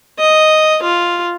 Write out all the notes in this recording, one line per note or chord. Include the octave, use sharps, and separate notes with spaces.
D#5
F4